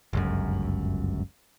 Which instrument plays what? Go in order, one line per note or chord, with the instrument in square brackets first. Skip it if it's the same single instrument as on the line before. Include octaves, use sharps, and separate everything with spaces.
[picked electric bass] G1 C#2 F#2